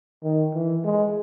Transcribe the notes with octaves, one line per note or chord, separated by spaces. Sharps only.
D#3
E3
G#3